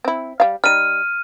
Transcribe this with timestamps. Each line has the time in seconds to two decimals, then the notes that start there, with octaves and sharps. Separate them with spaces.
0.04 C4 E4
0.40 G3 F5
0.64 G3 D#4 F6 D#7